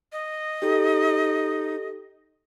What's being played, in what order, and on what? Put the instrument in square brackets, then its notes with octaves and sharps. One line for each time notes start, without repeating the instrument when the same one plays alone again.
[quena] D#5
[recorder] D#4 [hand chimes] G4 A4